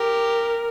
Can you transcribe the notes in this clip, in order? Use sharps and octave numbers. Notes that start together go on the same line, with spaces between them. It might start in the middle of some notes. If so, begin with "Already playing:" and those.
Already playing: G4 A#4